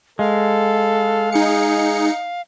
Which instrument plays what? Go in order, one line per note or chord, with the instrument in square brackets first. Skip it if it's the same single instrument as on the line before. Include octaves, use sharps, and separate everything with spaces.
[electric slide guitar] G#3 [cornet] A4 [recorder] F5
[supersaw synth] D#4 C#7 [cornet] G#4